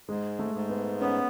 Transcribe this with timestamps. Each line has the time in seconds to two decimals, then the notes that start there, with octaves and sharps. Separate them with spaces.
0.09 G#2 G#3
0.39 A3
0.55 G#2
0.69 B3
1.01 B3 C#4